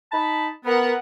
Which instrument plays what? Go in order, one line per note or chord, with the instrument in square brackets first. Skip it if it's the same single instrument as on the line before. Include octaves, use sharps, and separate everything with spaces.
[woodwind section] D#4 A5 B5
[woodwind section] B3 [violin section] A#4 F#5